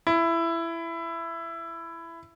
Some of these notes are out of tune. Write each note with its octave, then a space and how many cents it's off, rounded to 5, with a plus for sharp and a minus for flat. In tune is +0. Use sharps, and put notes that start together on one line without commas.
E4 +15